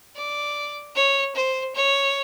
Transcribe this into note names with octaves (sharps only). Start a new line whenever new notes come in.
D5
C#5
C5
C#5